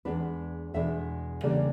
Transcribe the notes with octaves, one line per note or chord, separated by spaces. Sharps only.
E2 B2 G#3 B3 D4 B4
E2 B2 G#3 B3 D4 E5
C#3 E3 G3 A#3 D4 D5